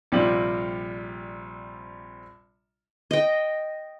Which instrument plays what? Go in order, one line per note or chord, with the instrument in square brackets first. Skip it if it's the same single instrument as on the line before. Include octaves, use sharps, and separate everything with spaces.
[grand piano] A#1 C3 G3 F4 F#7
[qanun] D#5 G5